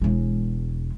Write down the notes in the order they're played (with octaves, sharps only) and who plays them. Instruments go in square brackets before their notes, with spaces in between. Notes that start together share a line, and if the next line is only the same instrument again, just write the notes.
[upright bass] E1 G#3